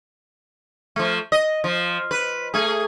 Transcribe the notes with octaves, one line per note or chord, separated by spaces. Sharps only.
F3 A3
D#5
F3
B4
A3 G#4